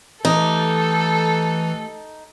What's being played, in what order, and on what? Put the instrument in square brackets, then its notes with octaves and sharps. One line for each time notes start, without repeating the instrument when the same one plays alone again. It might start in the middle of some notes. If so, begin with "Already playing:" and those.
[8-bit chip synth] E3 [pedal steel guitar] A3 G4 [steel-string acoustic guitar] D#4 [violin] A4